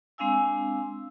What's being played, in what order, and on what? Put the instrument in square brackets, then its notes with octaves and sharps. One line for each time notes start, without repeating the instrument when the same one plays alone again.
[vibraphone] G#3 C4 D4 F5 G#5 E6